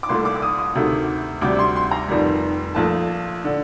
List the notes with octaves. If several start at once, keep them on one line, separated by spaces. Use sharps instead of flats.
D6
C2 A#2 A3 C6
D6
D6
D#6
D#6
D2 C3 D#3 A3
D2 C3 G3 D6
C6
C6
A#5
F1 F2 D#3 G3
A#1 A#2 F3 A3 A5
D3